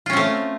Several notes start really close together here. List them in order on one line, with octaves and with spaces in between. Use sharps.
F4 C#4 C4 A3